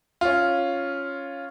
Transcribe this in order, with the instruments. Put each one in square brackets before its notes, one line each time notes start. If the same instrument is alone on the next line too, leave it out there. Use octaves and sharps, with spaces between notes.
[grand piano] C#4 F4